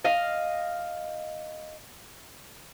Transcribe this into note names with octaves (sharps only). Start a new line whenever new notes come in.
D#5 F5